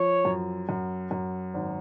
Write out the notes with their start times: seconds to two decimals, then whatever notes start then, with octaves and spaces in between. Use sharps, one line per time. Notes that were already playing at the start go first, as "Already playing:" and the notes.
Already playing: F3 C#5
0.25 F#2
0.69 F#2
1.11 F#2
1.54 G#1